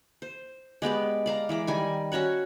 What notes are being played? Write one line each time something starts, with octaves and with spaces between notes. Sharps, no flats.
C5
G#3 B3 G4 D5
D5 F5 A#5
E3 G#3 D6
D#3 G3 G#5
C#4 F#4 C#5 F#5